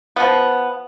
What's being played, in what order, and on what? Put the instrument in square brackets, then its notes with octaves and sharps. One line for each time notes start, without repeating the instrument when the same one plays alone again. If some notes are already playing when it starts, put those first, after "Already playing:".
[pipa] F3 B3